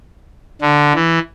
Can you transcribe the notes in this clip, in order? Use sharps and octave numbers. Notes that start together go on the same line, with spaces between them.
D3
E3